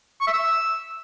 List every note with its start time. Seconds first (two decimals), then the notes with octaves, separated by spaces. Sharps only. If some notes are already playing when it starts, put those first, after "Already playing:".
0.21 C#6
0.27 E5
0.33 E6